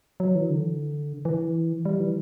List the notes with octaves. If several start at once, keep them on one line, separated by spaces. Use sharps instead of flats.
F#3
E3
D3
E3
G3
E3